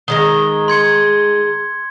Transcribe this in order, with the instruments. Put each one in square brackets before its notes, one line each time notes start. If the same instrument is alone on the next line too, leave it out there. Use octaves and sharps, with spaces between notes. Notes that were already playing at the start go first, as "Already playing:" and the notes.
[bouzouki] D#3 G#3 A#5 [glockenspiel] G7
[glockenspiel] C6 G#6 C#7